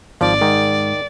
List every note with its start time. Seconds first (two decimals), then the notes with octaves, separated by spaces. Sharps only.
0.21 G#1 F3 D5
0.41 G#2 D#3